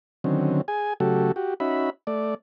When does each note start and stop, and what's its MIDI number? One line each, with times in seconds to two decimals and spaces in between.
0.24 0.61 50
0.24 0.61 51
0.24 0.61 54
0.24 0.61 60
0.24 0.61 61
0.68 0.93 68
0.68 0.93 80
1.00 1.32 49
1.00 1.32 54
1.00 1.32 57
1.00 1.32 66
1.00 1.32 67
1.00 1.32 69
1.36 1.54 66
1.36 1.54 67
1.60 1.90 61
1.60 1.90 63
1.60 1.90 66
1.60 1.90 76
1.60 1.90 83
2.07 2.34 57
2.07 2.34 74